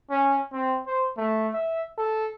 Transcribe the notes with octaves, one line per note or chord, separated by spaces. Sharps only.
C#4
C4
C5
A3
E5
A4